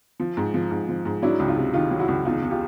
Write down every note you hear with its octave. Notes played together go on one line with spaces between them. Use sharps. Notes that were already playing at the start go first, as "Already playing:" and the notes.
F3
G#2
F3
G#2
F3
G#2
F#3 D4 E4
C#2
D#4 F4
C3
D#3 D#4 F4
F#3
E4 F#4
C#2
E2 D#4 F4
E2
F4 G4